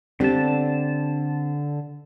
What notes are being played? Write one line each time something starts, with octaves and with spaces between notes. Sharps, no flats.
D3 C4 D4 G4 A5